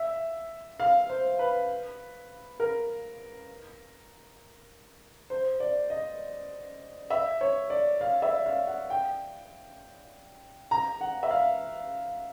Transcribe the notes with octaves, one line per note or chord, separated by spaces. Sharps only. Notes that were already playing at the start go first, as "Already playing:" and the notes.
Already playing: E5
F5
C5
B4
A#4
C5
D5
D#5
E5
C#5
D5
F5
E5
F5
F#5
G5
A#5
F#5
E5
F5